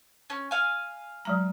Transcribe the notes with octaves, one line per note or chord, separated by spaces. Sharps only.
C#4
F5 G#5
F#3 G#3 A#5